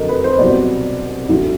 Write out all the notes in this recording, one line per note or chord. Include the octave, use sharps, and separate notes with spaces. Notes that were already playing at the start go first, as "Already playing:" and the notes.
Already playing: F2 D3 F#3 A4 A#4 D#5
B4
C5
C2 B2 F#3 D5
D2 D3 F#3